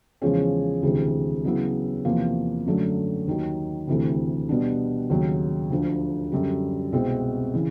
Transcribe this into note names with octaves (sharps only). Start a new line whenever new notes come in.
E2 C#3 F3 G#3 C#4
D2 C3 E3 G#3
C#3 F#3 B3 E4
E2 C3 F3 A#3
F#2 D3 F#3 A3
D#2 D#3 F#3
D2 C3 E3 A3
B2 G3 B3 D4
D#2 C#3 F#3
D2 D3 F3
F#2 D3 G3
C2 B2 G#3 C4
C#3 E3